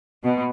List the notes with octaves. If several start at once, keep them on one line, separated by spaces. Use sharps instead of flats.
B2